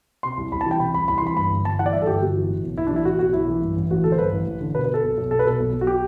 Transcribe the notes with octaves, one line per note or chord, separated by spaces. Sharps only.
C3 C6
C2
C2 B5
A5
E3 G5
C3 B5
C2 B5
C2 B5
C6
E3 B5
G2 B5
G1
G1 A5
E3 F#5
D5
G2 E5
A4
G1 G4
G1 F#4
E3
A2
B1
B1 E4
D4
E3
E4
A2 F#4
B1 F#4
B1 E4
E3
G2
A1
A1 F#4
D3 A4
C5
G2 B4
A1
A1
D3
B2 B4
B4
B2 A4
B1
B1
B2 A4
B4
B2 A4
B1
B1
F#4
G4